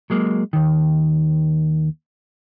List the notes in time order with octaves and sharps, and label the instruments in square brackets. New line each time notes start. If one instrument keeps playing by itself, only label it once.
[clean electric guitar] F#3 G#3 A#3
D#2 D#3